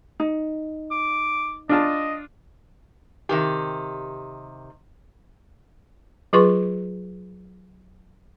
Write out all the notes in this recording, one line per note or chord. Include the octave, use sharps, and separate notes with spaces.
D#4
D6
D4 F4 D#5 A5
C3 D#3 G4
F#3 F4 G#4 B4 C6 C#6